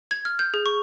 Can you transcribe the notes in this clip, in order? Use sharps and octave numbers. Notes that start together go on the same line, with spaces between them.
G#6
F6
G6
G#4
C#6